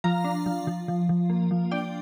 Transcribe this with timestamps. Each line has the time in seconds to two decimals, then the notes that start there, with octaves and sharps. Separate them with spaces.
0.04 F3 F5 A#5
0.24 D4
0.46 F3
0.67 F3
0.88 F3
1.09 F3
1.30 A#3
1.51 F3
1.71 D4 D5 G5